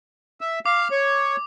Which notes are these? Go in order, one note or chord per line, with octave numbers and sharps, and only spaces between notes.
E5
F5 D6
C#5